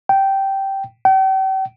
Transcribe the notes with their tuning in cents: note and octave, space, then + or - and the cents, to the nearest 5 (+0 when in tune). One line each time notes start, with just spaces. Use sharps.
G5 -10
G5 -40